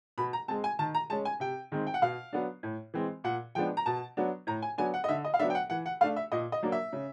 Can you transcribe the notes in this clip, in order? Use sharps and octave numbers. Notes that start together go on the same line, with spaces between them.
B2 B5
A#5
G#3 C4 A5
G#5
D#3 A5
A#5
G#3 C#4 A5
G#5
C3 G5
D#3 G#3 C4
G5
F#5
B2 F5
F#3 B3 D4
A2
E3 G#3 C4
A#2 F#5
F3 G#3 B3 D4 G5
A#5
B2 A5
F#3 B3 D4
A2 A#5
G#5
F#3 B3 D4 G#5
F#5
D#5
D3 E5
D#5
F5
F#3 B3 D4 E5
G5
F#5
E3 F#5
F#5
A3 D4 F5
E5
A#2 D#5
D#5
F#3 A#3 D4
E5
C#3